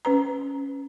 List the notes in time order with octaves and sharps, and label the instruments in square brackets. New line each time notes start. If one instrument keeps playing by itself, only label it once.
[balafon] C#4 B4 A#5